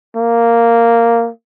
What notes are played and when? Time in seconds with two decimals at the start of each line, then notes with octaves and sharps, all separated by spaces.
0.16 A#3